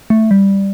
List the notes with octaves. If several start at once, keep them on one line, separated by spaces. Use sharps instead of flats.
A3
G3